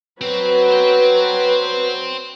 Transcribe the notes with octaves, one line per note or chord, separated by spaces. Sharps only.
F#3 C4 B4
C5 G5